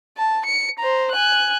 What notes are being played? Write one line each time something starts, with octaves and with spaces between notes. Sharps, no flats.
A5
C#7
C5 A#5
G#5 F#6